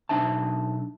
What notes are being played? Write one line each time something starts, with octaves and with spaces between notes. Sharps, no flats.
B1 D3 D4 D#4 E5 A5